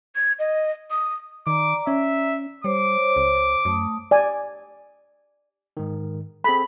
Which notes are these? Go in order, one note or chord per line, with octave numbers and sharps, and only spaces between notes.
G#6
D#5
D#6
D#3 D5 A#5 D6
C#4 E5
G3 C5 C#5 D6
C#2
F#2 A3 A5 D#6
D5 G#5
G#2 D#3
C4 G#4 A4 B5